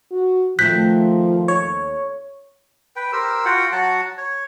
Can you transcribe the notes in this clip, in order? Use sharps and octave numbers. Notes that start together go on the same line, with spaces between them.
F#4
D#3 F3 A3 C4 F#6 G6 B6
D#2 C#5
B4 G5
G4 A#4 C5 E6
F4 F#4 F#5 G5
F#3 F#4 F#5 A5
C#5